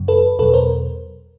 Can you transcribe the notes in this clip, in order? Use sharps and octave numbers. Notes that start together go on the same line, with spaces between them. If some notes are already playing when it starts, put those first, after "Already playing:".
Already playing: F#2 C#3 F#3
A4 B4
E2 B2 F#3 A4 B4
A#4 C5